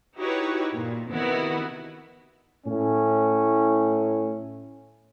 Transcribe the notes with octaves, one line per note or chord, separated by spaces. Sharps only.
D#4 E4 F#4 G4 B4 C#5
A#2
C3 D#3 B3 E4 F#4 B4
A2 C#4